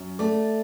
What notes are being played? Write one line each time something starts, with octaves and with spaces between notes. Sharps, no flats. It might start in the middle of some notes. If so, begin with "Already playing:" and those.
Already playing: F#2
A3 D5